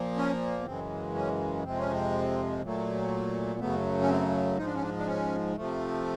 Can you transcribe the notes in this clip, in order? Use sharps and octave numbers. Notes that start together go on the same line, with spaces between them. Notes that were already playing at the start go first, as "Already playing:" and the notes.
Already playing: A#2 F3 A#3
C#4
B3
F#2 C#3 E3 G#3 C4
C#4
F2 C3 F3 G#3 C4
C#4
C4
A#2 F#3 A3
F#2 C#3 F#3 A3 B3
C#4
C4
G#2 F3 G#3 D#4
D4
C#4
D4
D4
C#4
C3 F3 A3